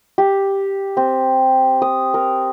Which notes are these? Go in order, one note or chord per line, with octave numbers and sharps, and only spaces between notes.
G4
C4
D#6
A#4